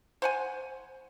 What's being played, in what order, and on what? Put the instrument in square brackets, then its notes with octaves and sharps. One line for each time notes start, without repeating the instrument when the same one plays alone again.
[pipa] C5 F#5 G#5